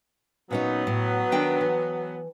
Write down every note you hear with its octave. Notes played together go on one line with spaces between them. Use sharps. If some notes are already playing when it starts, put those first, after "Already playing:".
A#2 F#3 B3 C#4 D#4
A2
D#3 D4 G5
E3